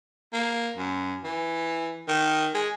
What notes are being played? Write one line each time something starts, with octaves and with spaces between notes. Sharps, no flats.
A#3
F#2
E3
D#3
G#3